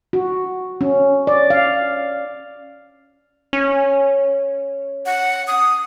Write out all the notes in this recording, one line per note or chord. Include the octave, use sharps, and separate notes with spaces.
F#4
C#4
D5
F5
C#4
F#5
D#6